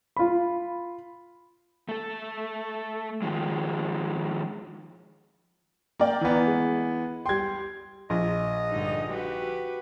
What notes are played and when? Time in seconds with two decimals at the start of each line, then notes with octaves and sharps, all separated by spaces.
0.17 F4 B5
1.89 A3 A4
3.22 D#3 F3 G#3
5.99 A#3 D5 G5
6.21 E3 B3
6.47 G#3
7.26 G3 G5 C6 G#6
8.10 A#1 D#5
8.70 G2 D3 D#4
9.12 F#4 G4 B4